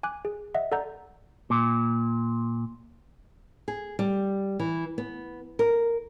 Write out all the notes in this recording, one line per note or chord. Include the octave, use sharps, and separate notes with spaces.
G#5 D6 F#6
G#4
D#5 E5 F#5
A4 D5 F#5 A#5 G6
A#2
G#4
G3
E3
B3
A#4